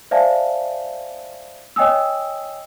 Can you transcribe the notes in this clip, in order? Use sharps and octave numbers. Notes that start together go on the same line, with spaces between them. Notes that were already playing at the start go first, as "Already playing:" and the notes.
C5 D5 E5 F5 G#5 A5
C#5 D#5 G5 G#5 D#6 E6